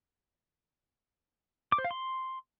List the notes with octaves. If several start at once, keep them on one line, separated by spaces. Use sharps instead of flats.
D6
C5
F5
C6